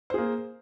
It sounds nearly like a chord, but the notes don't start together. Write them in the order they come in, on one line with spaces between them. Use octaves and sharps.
C5 G#4 A#3